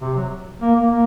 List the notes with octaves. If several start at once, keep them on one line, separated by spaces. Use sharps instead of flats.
C3
F#3
A#3
A#3
A#3